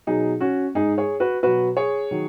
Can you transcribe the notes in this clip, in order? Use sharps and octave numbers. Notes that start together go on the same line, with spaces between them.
B2 F#3 D#4 G#4
C#4 F#4
G#2 G#3 D#4 G#4
G#4 C#5
F#4 B4
B2 F#3 F#4 B4
G#4 C#5
D#3 F#3